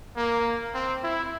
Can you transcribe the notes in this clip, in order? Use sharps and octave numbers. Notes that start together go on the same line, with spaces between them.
A#3
C4
E4